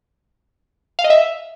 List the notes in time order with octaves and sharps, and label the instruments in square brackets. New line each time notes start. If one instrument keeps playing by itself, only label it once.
[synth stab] F5
D#5
E5